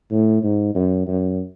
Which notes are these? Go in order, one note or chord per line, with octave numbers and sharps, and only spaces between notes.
A2
G#2
F#2
F#2